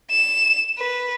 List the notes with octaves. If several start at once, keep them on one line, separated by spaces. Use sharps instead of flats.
E7
B4